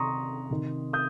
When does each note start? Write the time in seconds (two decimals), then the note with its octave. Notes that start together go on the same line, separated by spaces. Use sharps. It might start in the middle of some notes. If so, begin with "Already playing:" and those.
Already playing: C3 D#3 A#5 C6 C#6 D#6
0.50 C3 D#3
0.93 D#6 G6